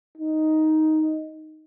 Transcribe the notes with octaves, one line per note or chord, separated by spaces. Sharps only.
D#4